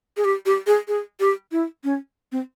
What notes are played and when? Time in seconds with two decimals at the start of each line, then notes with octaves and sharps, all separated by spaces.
0.17 G#4
0.25 G4
0.46 G4
0.67 G#4
0.88 G#4
1.20 G4
1.52 E4
1.84 C#4
2.32 C4